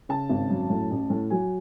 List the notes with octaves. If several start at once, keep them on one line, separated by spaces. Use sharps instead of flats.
C#3 A5
G#1
F#2
A2
A1
A2
F#3 G#5